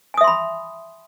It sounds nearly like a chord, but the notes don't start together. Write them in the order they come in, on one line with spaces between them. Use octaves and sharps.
G#5 D#6 E5 C6 B5